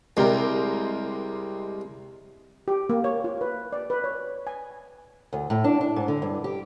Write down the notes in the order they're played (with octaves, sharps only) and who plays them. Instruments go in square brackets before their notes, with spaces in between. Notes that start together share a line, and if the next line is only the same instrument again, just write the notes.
[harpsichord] C2 [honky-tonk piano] G#3 G4 A#4
[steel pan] G4
A#3
C#5
F4
B4
D5
B4
C#5
G#5
[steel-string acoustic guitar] D2
A2
D4
D4
G#2
D3
G2
G4